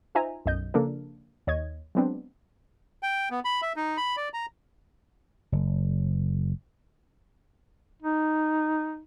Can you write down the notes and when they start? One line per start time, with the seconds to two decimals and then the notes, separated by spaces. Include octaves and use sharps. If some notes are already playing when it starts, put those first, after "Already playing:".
0.15 D#4 F4 C5 E5 G#5 A#5
0.46 B1 F#2 D#5 G6
0.74 C#3 F3 A#3 D4 A4 A#4
1.47 D#2 C#5 D#5 G#6
1.95 F#3 G#3 B3 C4 D4
3.03 G5
3.31 B3
3.45 B5
3.62 E5
3.76 D#4
3.97 B5
4.17 D5
4.34 A#5
5.52 F#1
8.02 D#4